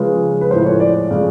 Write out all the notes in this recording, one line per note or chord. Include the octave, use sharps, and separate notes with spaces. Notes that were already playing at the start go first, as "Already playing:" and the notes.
Already playing: C#3 F3 G#3 B4
B4
A2 F3 G#3 C5
C#5
D5
C#3 F3 G#3